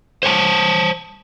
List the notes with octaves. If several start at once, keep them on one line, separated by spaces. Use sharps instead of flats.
C5 C#5 G#5 A5